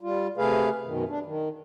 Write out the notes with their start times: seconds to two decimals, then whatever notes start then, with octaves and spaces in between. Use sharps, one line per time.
0.01 G3 F4
0.37 C3 A3 G#4 B4 F5
0.85 F#2 B2 D#3
1.09 D4
1.25 D#3